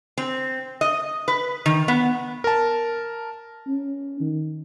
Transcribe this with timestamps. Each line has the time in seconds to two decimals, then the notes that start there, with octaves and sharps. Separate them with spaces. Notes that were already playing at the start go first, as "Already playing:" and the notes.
0.18 C4
0.81 D#5
1.28 B4
1.66 D#3
1.88 B3
2.44 A#4 A5
3.67 C#4
4.20 D#3